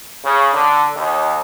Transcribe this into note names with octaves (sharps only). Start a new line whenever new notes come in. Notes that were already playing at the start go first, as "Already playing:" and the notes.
C#3
D3
D#2